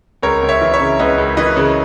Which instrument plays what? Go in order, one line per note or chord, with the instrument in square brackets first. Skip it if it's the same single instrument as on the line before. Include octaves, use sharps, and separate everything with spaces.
[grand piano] C#2 A#4 C#5
C#2
C#5 E5
E3
C#5 E5
C#3
C#2 B4 D#5
C#2
E3 B4 D#5
C#3